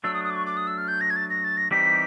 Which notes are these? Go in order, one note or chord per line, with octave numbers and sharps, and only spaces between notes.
F#3 A3 D4 E6
D#6
D#6
D6
C#6
D6
D#6
E6
F6
G6
A#6
G#6
A6
A#6
A6
A#6
E3 G3 C4 D#4 G4 B6